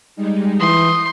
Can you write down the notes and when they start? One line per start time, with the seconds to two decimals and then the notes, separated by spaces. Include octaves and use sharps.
0.16 G3 G#3 D#4
0.60 E3 C6 D#6 G6